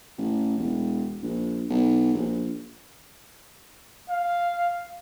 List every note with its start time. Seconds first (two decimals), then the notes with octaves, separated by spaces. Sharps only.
0.18 A1
0.58 E1
1.23 A#1
1.70 B1
2.14 A#1
4.10 F5